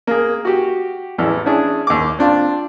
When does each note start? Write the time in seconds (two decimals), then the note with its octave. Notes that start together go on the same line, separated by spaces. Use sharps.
0.07 A#3 G#4
0.45 F#4 G4
1.18 A1 E2 E3
1.46 C#4 D4 E4 G#4
1.87 D#2 D6
2.19 C4 D4 F4